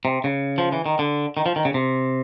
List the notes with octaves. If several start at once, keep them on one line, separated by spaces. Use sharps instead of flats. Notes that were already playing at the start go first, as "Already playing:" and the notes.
C3
C#3
F3
E3
D#3
D3
D#3
F3
D#3
C#3
C3